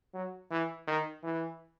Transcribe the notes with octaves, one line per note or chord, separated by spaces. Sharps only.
F#3
E3
D#3
E3